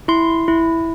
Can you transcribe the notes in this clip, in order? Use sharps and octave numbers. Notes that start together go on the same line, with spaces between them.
E4 C6
E4